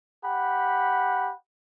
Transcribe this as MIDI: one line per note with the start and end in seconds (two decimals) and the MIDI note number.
0.24 1.32 67
0.24 1.32 78
0.24 1.32 83